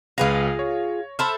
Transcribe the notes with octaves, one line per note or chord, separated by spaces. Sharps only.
C#2 F4 G#4 B4 F5 A#6
C#5
A4 C5 E5 B5 F6